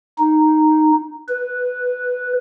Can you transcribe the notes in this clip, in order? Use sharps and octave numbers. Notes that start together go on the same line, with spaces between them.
D#4
B4